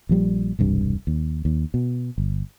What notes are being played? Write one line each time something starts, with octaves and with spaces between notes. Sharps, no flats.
A#1 F3 G3
E1 C2 G2
D#2
D#2
B2
G1